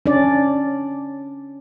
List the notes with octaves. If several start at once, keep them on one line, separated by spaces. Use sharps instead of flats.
C#4 D4 D5